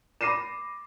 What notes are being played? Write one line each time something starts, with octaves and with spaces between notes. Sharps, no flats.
B5 D6 A#6 C7 D#7 E7